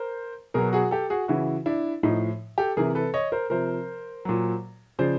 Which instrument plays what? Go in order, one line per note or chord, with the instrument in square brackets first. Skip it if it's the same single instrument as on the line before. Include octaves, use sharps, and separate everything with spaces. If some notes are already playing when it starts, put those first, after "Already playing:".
Already playing: [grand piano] A#4 C5
B2 F#3 G#4 A#4
F#4 G#4
G4 A4
F#4 G#4
C#3 E3 E4 F#4
D4 E4
A2 F3 D#4
G4 A4
C3 E3 G#4 A#4
A4 B4
C#5 D#5
A#4 C5
C3 F3 A#4 C5
A#2 F#3
C#3 F3 C5 D5